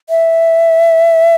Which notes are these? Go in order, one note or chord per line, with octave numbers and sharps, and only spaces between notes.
E5